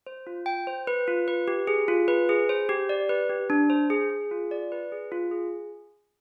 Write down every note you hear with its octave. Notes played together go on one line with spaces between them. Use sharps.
C5
F4
G5
C5
B4
F4
B4
G4
G#4
F4
B4
G#4
C5
G4
D5
B4
G4
D4
C5
G#4
G#4
F4
D5
B4
G#4
F4
G#4